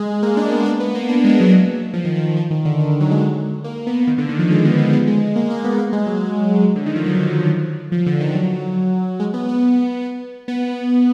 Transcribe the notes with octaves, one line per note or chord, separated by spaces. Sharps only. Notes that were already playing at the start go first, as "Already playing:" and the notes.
Already playing: G#3
A#3
D4
B3
D4
B3
A#3
D4
G#3
A#3
F#3
F3
D#3
D#3
D#3
F3
D#3
D3
D#3
F#3
G#3
A#3
B3
D#3
D3
D#3
F3
G#3
B3
B3
B3
G#3
A#3
A#3
B3
A#3
G#3
F#3
D3
D#3
F3
F#3
F3
D3
D#3
F#3
G#3
B3
B3
B3